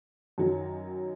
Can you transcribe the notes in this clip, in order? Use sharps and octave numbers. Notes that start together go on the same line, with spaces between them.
F#2 D#3 F#3